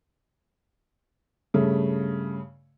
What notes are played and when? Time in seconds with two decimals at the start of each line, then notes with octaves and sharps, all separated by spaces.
1.54 G2 C#3 A3